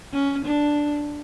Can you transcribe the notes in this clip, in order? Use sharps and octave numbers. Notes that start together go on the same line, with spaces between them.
C#4
D4